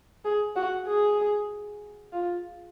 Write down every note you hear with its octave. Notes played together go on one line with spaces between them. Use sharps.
G#4
F#4
G#4
F4